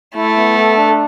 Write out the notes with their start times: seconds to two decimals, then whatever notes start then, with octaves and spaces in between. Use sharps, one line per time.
0.15 A3 E4
0.36 B3
0.56 A4
0.77 D4